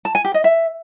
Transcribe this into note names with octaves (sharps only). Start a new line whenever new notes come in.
A5
G#5
G4
D#5
E5